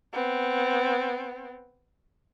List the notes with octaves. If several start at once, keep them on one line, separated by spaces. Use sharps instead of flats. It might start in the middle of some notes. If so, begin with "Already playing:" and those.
B3 C4